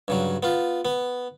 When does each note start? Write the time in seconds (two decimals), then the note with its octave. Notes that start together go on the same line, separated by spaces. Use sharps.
0.08 G2 C#3 F#3
0.43 B3 F4
0.85 B3